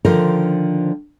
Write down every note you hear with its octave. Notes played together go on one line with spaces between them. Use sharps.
D3 D#3 F3 F4 A#4 C5